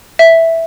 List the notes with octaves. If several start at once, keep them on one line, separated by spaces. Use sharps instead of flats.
E5